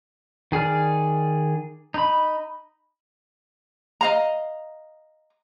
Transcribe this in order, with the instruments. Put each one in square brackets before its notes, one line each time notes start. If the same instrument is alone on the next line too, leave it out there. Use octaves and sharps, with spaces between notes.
[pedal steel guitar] D#3 G#4 D5 F6
D#4 B5
[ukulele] D#5 F5 A#5